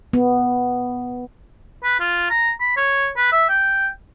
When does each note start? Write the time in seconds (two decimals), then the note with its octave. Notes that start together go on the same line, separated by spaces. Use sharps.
0.13 B3
1.84 B4
2.00 F4
2.30 A#5
2.60 B5
2.76 C#5
3.17 B4
3.32 E5
3.49 G5